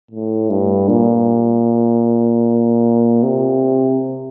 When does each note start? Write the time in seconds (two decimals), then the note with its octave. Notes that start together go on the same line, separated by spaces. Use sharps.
0.11 A2
0.50 G2
0.89 A#2
3.23 C3